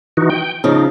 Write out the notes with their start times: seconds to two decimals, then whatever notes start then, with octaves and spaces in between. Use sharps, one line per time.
0.17 E3 D#4 F#4
0.30 G5
0.64 C#3 F3 D#4